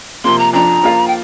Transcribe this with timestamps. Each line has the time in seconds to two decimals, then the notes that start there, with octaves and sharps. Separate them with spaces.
0.24 C3 F3 A#3 C6
0.38 A#5
0.53 F2 F3 D4 A#5
0.83 F3 A#3 F4
1.07 G5